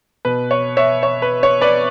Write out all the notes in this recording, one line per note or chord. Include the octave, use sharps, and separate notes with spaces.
B2 B4
C#5
C#5 E5
C#5
B4
C#5
B4 D5